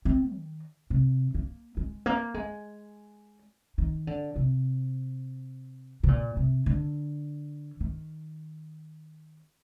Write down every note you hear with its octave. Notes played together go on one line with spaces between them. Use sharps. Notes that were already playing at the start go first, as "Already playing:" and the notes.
C4
D#3
C3
A#3
G#3
A#3
G#3
D#3
D3
C3
C3
A#2
C3
D3
D#3